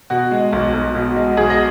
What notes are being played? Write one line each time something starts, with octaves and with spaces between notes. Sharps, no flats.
B2 F#4
G#3
B1
B1
B2
G#3
B1 G#4
D#5